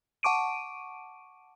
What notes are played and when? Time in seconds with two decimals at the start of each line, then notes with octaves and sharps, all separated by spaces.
0.23 F#5 A5 C#6 D6 D7 D#7